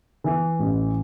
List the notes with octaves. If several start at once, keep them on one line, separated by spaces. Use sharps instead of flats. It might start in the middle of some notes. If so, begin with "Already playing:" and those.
E3
A1